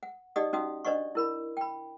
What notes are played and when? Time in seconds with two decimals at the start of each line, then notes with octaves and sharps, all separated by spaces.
0.03 F#5
0.36 D#4 G4 D5 D#5 F#5 D#6
0.53 C#4 D#4 F#4 F5 D#6
0.85 D4 C5 D5 D#5 F#5 C#6
1.15 E4 A#4 B5
1.57 G5 B5